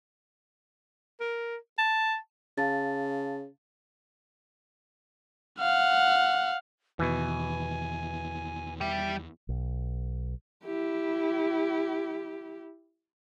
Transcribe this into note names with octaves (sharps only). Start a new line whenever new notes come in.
A#4
A5
C#3 F5 A5 A6
F5 F#5
E2 B2 D#3 E3 G#5
G3 E5
B1
E4 G4